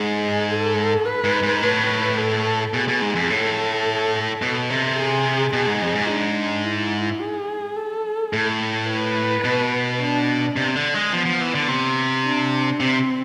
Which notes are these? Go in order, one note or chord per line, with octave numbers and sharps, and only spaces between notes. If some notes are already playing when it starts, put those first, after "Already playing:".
Already playing: G#2 G#4
A4
B4
G#2
G#2
A2 B4
A4
B2 G#4
B2
G#2
F2
A2 A4
B2
C3
G#4
B2 G#4
G#2
F2
G#2
D4
E4
G#4
A4
A2
B4
B2
D4
C3
D3
G#3
F3 B3
F3
E3
D3
C3
D4
C3 C4